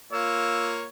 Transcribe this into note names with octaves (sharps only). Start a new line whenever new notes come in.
A#3 F4 C#5 E6